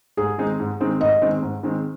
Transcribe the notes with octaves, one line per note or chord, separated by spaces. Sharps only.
G#2 G#4
D#3 G#3 C4 D#4
G#2
D#3 G#3 C4 D#4
G#2 D#5
D#3 G#3 C4 D#4
G#2
D#3 G#3 C4 D#4